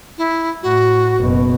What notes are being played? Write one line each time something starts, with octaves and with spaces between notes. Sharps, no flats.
E4
A2 F#4
F#1 B2